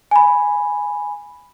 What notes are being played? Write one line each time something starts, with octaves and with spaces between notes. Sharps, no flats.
G#5 B5